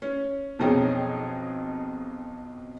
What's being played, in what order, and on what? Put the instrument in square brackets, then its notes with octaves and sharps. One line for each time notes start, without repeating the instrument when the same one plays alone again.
[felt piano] C#4
B1 F2 C#4 D#4 G#4 G5